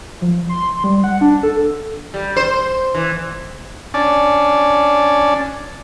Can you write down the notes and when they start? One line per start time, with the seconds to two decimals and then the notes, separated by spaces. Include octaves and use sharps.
0.22 F3
0.49 C6
0.84 G3
1.04 F#5
1.21 D4
1.43 A4
2.14 G3
2.37 C5
2.95 E3
3.94 C#4 D4 D5